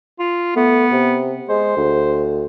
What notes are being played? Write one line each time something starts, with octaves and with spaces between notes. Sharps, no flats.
F4
A3 B3
C3
G#3 C5
D2